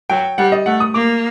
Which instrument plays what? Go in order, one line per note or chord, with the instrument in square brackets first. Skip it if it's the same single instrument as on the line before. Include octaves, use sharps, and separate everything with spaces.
[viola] F#3 [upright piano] G5
[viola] G3 [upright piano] F#5
[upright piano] D#5
[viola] A3 [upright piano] F#5
[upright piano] D#6
[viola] A#3 [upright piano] D6